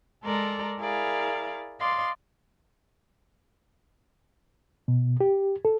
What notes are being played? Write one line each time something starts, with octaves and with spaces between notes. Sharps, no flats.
G#3 A4 A#4 D5 A#5 C6
E4 G#4 A#4 D5 F5
D5 D#5 F5 C6
B2
G4
A4